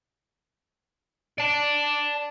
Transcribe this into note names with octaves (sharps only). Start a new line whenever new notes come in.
D5 A5